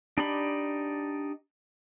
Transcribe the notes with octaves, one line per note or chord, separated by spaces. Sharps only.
D4 D#4 G4 D5 B5